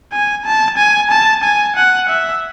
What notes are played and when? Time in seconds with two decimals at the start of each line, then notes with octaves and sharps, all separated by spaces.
0.12 G#5
0.45 A5
0.78 G#5
1.11 A5
1.43 G#5
1.76 F#5
2.09 E5